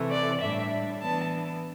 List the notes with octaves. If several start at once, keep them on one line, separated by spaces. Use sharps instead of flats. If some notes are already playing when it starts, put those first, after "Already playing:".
Already playing: C3 E3 A3
D5
A2 G3 D4 E5
E3 B3 D4 A5